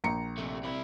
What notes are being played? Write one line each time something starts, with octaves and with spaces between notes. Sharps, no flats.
A#1 A#5 C#7
C3 A3
C3 E4